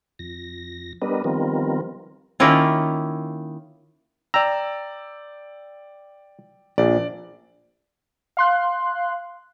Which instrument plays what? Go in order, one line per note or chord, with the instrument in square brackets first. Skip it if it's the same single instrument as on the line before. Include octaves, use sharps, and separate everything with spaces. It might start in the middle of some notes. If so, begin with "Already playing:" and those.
[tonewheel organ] F2 A#6
G3 B3 D4 A#4 B4 D#5
D#3 F3 G3 B3 C4 A#4
[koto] D#3 A#3 C#4 E4 F4
[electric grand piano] D5 G5 E6 [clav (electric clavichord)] A#5
[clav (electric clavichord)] A#1 [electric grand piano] D5
[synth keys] F5 C6 F#6